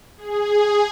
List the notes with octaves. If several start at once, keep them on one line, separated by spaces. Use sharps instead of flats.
G#4